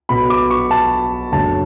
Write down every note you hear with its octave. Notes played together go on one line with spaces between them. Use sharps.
B1 B2 F#3 B5
D6
C#6
A5
F#1 F#2 D3 A5